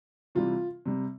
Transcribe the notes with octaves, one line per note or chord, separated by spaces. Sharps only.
C3 E3 G3 F4
C3 G3